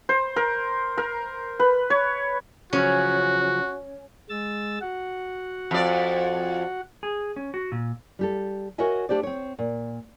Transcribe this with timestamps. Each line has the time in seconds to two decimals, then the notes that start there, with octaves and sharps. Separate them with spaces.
0.09 C5
0.36 A#4
0.98 A#4
1.60 B4
1.90 C#5
2.73 C#3 F3 F#3 C#4 F#4
4.29 G#3 E6 A6
4.81 F#4 F#5
5.71 F2 D5
7.03 G#4
7.36 C#4
7.54 F#4
7.72 A#2
8.19 G3 G4 A4
8.78 F#4 A#4 C#5 D#5 E5 G#5
9.09 A3 D4 G4 C5 D5
9.23 C4 C#5
9.59 A#2